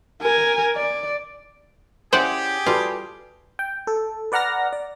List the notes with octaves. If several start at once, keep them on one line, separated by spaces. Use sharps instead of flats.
A#4 G#5
D5
C#4 E4 G4 G#4 C5 D5 F#5 G5
G3 F4 F#4 A4 B4
G5
A4
B4 D5 F#5 A#5 F6 A#6
D5